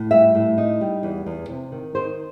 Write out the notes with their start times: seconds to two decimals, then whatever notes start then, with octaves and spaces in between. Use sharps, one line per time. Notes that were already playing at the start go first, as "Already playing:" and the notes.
Already playing: A2
0.11 G3 E5
0.35 A2
0.58 D#4
0.81 G3
1.03 E2
1.26 E2
1.49 C3
1.72 D#3
1.95 D#3 C5